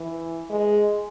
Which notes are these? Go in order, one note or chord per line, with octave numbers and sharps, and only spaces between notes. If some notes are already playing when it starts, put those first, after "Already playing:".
Already playing: E3
G#3